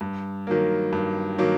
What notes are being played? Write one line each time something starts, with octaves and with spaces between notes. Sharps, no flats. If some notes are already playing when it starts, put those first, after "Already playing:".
G2
D#3 F#3 A#3
G2
D#3 F#3 A#3